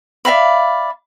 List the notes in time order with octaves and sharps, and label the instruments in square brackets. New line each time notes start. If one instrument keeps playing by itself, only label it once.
[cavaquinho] D5 E5 F5 B5